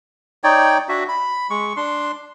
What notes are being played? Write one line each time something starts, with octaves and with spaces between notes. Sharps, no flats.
D#4 C#5 D5 G5
D4 F#4 E5
B5
G#3 C#6
D4 C6